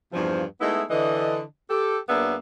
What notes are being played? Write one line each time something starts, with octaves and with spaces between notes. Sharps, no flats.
E2 G2 C3 F3
G#3 A3 B3 D#4 E4
D3 E3 D#5
G4 A4
F#2 A#3 B3 D4 G#4 E5